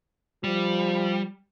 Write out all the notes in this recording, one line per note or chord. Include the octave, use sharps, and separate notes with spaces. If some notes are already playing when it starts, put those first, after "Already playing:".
F3 G3